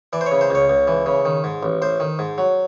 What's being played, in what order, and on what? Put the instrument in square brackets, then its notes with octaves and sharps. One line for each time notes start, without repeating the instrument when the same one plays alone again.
[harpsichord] E3 D5
C5
C#5
C#3
C5
C#2 C#5
C#2
E3
C#3
D#3
G#2
A1
A1 C5
D#3
G#2
F#3